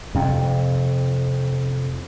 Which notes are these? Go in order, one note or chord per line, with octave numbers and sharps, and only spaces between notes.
F2 C3